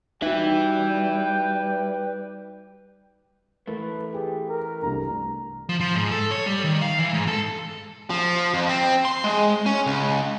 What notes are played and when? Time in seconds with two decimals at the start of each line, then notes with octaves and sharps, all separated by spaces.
0.22 G3 D#4 F#4 B4 E5 G5
3.67 E3 A3 A#4 B4
4.14 G4 G#4
4.49 A#4
4.82 C2 G2 A#5
5.69 F3
5.80 F3
5.95 G#2
6.11 A4
6.31 C#5
6.46 G3
6.64 D#3
6.81 F5
6.99 E3
7.14 G#2
7.28 A4
8.10 F3
8.54 F2
8.69 C4
9.05 C6
9.24 G#3
9.66 C#4
9.86 C#2